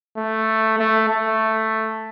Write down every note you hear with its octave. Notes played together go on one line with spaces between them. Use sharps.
A3
A3
A3